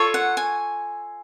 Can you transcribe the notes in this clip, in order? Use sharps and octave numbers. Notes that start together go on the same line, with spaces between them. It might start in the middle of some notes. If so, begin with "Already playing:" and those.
Already playing: F4 A4 C#5
F#5
G#5